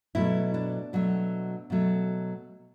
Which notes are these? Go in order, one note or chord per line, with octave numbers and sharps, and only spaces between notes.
B2 F#3 A3 E4
D4
B2 F#3 A3
B2 F#3 A3